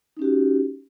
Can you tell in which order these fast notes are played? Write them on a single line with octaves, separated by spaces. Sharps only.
D#4 C#4 G4 F#4